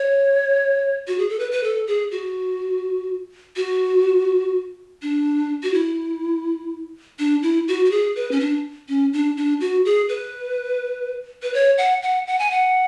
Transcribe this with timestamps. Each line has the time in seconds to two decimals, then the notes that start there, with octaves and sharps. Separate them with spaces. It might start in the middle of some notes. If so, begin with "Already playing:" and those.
Already playing: C#5
1.07 F#4
1.19 G#4
1.29 A4
1.39 B4
1.52 B4
1.64 A4
1.87 G#4
2.11 F#4
3.56 F#4
5.02 D4
5.63 F#4
5.74 E4
7.19 D4
7.43 E4
7.68 F#4
7.85 F#4
7.91 G#4
8.16 B4
8.31 C#4
8.40 D4
8.89 C#4
9.13 D4
9.37 D4
9.60 F#4
9.85 G#4
10.09 B4
11.43 B4
11.54 C#5
11.78 F#5
12.02 F#5
12.27 F#5
12.39 G#5
12.51 F#5